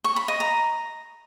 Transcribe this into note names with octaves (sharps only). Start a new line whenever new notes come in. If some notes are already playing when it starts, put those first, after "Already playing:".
C#6
B5
D#5
A#5